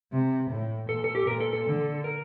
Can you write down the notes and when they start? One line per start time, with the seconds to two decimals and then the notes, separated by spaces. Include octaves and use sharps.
0.12 C3
0.51 A2
0.89 A#2 A4
1.04 A4
1.15 G4
1.27 A#2 A#4
1.40 A4
1.53 A4
1.66 D3
2.04 A#4